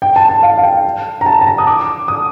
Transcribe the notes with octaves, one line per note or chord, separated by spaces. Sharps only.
G5
A5
A5
F5
F5
G5
A#5
A5
A5
A#5
D#6
D6
D#6